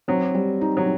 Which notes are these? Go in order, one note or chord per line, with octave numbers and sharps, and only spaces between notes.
F#3 C4
G3
D#4
F#3